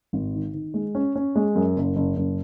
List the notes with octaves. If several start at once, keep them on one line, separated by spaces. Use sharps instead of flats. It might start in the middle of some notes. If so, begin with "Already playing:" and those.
G#1
D#3
D#3
G#3
C#4
C#4
G#3
F#2
F#1
F#1
F#1